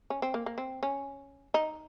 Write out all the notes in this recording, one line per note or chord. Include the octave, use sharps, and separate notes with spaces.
C#4
C4
A#3
A#3
C4
C#4
D#4